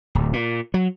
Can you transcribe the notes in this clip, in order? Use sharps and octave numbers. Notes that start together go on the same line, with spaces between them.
D1
A#2
F#3